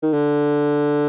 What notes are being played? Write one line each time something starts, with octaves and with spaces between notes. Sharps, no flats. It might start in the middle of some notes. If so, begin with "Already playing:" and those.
D#3
D3